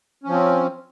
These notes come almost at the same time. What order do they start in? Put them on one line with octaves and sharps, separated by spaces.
C#4 F3 C4